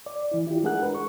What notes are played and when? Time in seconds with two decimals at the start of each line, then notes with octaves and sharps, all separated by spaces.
0.06 D5
0.32 E3 E4
0.47 E4 F4 G4
0.64 G#3 D4 G#4 A#4 F#5 F#6
0.83 A#4 B4
0.95 C#6